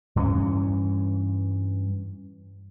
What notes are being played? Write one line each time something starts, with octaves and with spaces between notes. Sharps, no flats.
G2 E3 C4 C#4